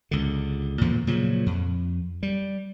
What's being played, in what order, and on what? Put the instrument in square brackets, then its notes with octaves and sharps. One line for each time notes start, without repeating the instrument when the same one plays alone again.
[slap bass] C#2 D3
E2 A#2 D3 F3
A#2 C#3 F3 F#3
F2
G3